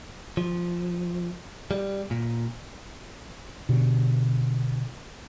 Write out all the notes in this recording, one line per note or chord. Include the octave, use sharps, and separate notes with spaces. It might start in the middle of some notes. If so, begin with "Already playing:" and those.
F3
G3
A#2
B2 D3